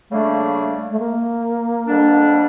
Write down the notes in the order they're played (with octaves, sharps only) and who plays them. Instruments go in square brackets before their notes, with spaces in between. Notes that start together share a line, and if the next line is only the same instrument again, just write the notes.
[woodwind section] C#3 G3 A#3 D4 [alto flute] A3
[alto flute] A3
A#3
[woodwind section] F2 D3 G3 D4